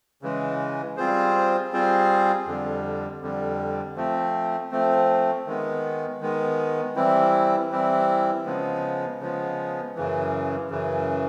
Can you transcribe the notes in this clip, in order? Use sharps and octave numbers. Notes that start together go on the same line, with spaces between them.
C#3 E3 G#3
G3 C4 F4 G#4 C5
G3 C4 F4 G#4 C5
F2 D3 G3
F2 D3 G3
F3 A3 C4
F3 A3 C4
D#3 G#3 B3
D#3 G#3 B3
E3 G3 C4 E4
E3 G3 C4 E4
C#3 F3 G#3 B3
C#3 F3 G#3 B3
F#2 C#3 E3
F#2 C#3 E3